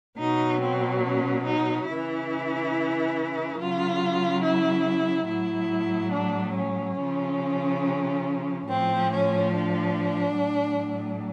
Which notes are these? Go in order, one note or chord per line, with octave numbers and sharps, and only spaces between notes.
B2 F#3 D#4
C4
C#4
D#4
C#3 E3 E4
C#3 F#3 F4
E4
A2 F#3 E4
D4
C#4
C#3 F3
A2 F3 C4
C#4
D4
A2 F#3